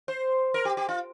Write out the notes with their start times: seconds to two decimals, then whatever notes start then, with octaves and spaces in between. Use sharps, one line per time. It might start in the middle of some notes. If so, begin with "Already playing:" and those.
0.08 C5
0.54 A#4
0.65 G4
0.77 G4
0.89 F4